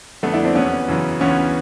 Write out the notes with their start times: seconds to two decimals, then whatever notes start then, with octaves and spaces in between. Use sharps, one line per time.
0.23 F2 D3 A3 B3
0.33 D4 E4
0.45 C4 D4
0.55 E2 C3 E3 B3 C#4
0.89 F#2 C#3 E3
1.21 D2 C#3 E3 B3 C#4